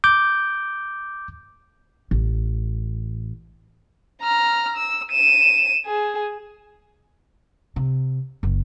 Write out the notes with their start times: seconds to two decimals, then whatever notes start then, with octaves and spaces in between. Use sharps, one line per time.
0.04 D6 G6
2.11 A1
4.22 A#5 F6
4.76 E6
5.12 D#7 E7
5.86 G#4
7.76 C3
8.43 F#1